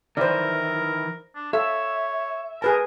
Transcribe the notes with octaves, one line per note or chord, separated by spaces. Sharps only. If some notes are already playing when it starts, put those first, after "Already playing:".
D#3 E3 E4 A#4 C5 D5
D4
A4 C#5 E5 F5
G#4 A#4 B4 A5